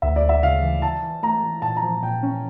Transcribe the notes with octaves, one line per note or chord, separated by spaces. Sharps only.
D2 E5
D5
D2
E5
C#3 F5
E3
E3 A5
E3
A3 A#5
E3
A#2 A5
A#5
F3
A#2 G5
C#4